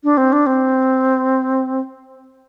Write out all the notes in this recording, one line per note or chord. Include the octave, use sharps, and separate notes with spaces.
D4
C4
D4
C4